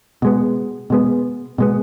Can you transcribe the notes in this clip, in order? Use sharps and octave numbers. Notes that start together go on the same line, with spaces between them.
B2 G#3 B3
B2 G#3 B3
B2 G#3 B3